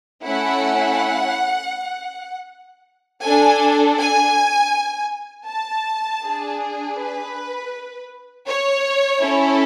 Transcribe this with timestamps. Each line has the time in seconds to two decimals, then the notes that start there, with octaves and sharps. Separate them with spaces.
0.25 A3 C#4 E4 F#5
3.23 D4 A4 G#5
3.98 G#5
5.48 A5
6.23 D4 G#4
6.98 B4
8.48 C#5
9.22 C#4 E4 A4